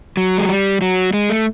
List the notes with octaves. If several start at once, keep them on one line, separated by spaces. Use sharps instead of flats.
F#3
G#3
G3
F#3
G#3
A3